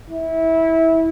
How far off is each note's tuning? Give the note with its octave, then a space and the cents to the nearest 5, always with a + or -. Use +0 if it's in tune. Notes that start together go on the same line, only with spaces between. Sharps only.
E4 -20